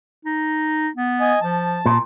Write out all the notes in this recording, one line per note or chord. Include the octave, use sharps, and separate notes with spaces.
D#4
B3
D#5 G#5
F3 A5
A#2